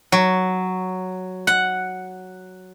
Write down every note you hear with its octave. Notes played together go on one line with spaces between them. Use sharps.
F#3
F#5